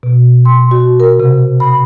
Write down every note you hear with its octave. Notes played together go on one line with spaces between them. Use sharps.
B2
C6
F#4
A#4
C3
B5